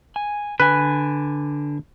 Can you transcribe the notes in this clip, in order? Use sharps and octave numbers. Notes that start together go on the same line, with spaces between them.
G#5
D3 B4 G#5